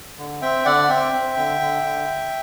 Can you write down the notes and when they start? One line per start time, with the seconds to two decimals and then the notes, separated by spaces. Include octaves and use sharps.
0.18 D3
0.42 C4 E5 G5
0.65 D3 D5 F#5
0.89 C4 E5 G5
1.13 C4
1.36 D3
1.60 D3
1.83 D3